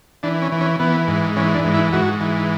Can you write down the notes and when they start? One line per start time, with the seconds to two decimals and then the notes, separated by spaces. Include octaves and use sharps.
0.23 E3 D4
0.42 C#4
0.52 E3
0.61 C#4
0.79 E3 B3
1.08 G#2
1.36 E3 C#4
1.55 D4
1.65 G#2
1.74 E4
1.92 G#2 F#4
2.21 E3